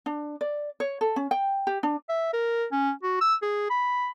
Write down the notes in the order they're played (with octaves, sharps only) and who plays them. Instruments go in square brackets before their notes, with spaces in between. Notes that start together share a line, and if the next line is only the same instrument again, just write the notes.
[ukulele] D4
D5
C#5
A4
C#4
G5
G4
D4
[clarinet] E5
A#4
C#4
F#4
E6
G#4
B5